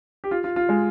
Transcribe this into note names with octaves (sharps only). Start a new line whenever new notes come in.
G4
F4
F4
F4
G#3